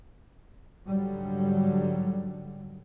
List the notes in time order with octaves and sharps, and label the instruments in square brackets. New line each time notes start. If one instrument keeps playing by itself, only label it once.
[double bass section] G#2 D3 F#3 G3